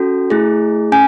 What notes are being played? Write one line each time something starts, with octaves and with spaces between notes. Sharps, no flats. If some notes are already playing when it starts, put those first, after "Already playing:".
Already playing: C#4 F#4 A4
A3 E4 G#4
C#4 G#5